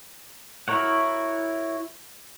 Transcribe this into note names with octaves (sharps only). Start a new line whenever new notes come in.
E4 F#4 A#4 C#5 F#5